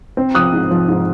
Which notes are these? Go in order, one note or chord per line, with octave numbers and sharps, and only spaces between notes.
C4
F3 D#6 F#6
G#2
F3
G#2